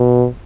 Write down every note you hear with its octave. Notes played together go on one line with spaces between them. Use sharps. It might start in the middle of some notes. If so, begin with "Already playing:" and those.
Already playing: B2